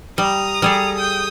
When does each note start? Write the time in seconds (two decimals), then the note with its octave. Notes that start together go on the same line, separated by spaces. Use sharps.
0.18 G3 A#5 D#6
0.62 G3 G#4 A4
0.95 G5 D#6